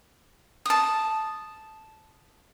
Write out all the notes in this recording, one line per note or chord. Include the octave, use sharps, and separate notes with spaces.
A5 D#6